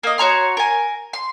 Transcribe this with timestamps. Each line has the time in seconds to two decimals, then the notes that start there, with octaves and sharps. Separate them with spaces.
0.03 A#3 D#5
0.18 F#4 C#5 A#5 C6
0.57 A#4 G#5
1.13 C6